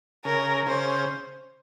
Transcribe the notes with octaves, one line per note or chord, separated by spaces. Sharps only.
C#3 A#4
C#3 C5